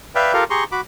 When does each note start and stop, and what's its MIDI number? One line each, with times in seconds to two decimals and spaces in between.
0.15 0.33 71
0.15 0.33 74
0.15 0.33 76
0.15 0.33 77
0.15 0.33 79
0.33 0.44 65
0.33 0.44 67
0.33 0.44 69
0.33 0.44 70
0.33 0.44 77
0.50 0.64 67
0.50 0.64 68
0.50 0.64 82
0.50 0.64 84
0.50 0.64 85
0.72 0.81 66
0.72 0.81 83
0.72 0.81 86